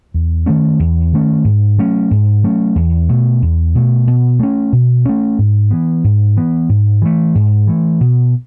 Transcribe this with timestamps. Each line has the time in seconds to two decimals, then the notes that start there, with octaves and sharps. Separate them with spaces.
0.14 E2
0.46 D#3 A3 C#4
0.79 E2
1.13 D#3 A3 C#4
1.45 G#2
1.78 F#3 A3 C#4
2.11 G#2
2.44 F#3 A3 C#4
2.76 E2
3.09 B2 A3
3.42 E2
3.75 B2 A3
4.07 B2
4.39 A3 C#4
4.72 B2
5.06 A3 C#4
5.38 G#2
5.71 E3 B3
6.04 G#2
6.37 E3 B3
6.69 G#2
7.02 E3 A3
7.35 G#2
7.67 E3 A3
8.01 B2